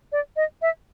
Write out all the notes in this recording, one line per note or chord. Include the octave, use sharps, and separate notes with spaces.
D5
D#5
E5